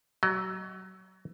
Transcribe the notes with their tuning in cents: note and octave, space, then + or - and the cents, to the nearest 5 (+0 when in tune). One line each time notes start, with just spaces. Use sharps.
F#3 +25 D#5 -15